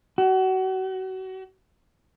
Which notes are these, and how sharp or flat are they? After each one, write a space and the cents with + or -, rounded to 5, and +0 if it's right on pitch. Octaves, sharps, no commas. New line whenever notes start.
F#4 +30